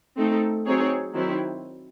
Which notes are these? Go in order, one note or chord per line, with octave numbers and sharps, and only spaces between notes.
A3 C4 D#4 A4
F#3 C4 D#4 G#4 C#5
D#3 F#3 C4 E4